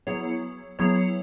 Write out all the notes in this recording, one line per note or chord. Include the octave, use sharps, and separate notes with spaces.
F#3 B3 E4 G#4 C#5
F#3 B3 E4 G#4 C#5